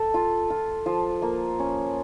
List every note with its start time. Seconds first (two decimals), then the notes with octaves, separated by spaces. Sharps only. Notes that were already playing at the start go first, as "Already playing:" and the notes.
Already playing: A4
0.14 F4
0.50 F4
0.86 F3
1.22 A#3
1.59 C#4